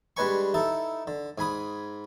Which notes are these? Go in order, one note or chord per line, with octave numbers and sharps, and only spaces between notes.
G3 G#3 D4 B4 G#5 C#6
D#4 E4 A4
D3
G#2 G#5 B5 D#6